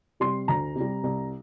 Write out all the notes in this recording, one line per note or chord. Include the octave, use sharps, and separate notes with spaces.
C3 G3 C6
D2 A#5
C3 G3
C2